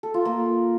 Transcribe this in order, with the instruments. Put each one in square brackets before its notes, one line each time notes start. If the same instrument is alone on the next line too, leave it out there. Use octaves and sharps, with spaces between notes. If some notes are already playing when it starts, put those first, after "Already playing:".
[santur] A4
F4
A#3